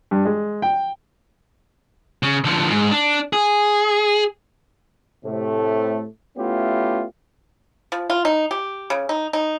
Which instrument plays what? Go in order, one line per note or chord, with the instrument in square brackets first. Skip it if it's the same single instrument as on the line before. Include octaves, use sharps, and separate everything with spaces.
[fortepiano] G2
G#3
G5
[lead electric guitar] C#3
D3 F3
G#2
D4
G#4
[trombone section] A2 C3 A3
A3 B3 C#4 E4 F4 G4
[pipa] F3
F4
D#4
G4
C#3
D#4
D#4